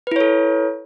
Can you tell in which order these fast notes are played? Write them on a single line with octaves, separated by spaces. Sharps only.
B4 E4 C#5 A4